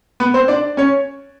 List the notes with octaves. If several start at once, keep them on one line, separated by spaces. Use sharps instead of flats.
B3 B4
C4 C5
D4 D5
C#4 C#5